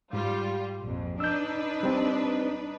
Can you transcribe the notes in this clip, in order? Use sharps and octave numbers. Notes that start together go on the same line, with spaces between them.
G#2 G3 F4
A#1 F2
D4 D#4 B4 E6 G6
G3 C4